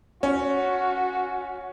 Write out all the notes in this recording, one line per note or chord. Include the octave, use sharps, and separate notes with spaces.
C#4 F#4